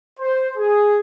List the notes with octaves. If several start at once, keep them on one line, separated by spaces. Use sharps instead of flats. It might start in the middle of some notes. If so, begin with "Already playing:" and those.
C5
G#4